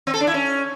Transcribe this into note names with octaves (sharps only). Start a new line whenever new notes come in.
C4
A4
D4
E4
C#4